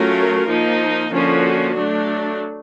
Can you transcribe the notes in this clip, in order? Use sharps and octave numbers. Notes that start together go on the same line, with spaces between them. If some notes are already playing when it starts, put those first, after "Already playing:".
Already playing: F#3 A3 C#4 F4 A#4
F3 A#3 D#4
D3 F3 A#3 C#4 F#4
F#3 A3 D4